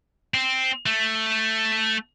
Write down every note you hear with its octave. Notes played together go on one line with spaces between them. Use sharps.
C4
A3